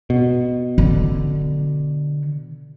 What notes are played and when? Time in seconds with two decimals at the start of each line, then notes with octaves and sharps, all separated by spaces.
0.10 B2
0.78 D3